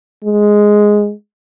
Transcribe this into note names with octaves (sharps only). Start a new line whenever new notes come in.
G#3